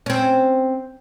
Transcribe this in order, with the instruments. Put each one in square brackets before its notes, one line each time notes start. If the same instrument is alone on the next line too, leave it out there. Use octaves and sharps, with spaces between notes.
[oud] C4 C#4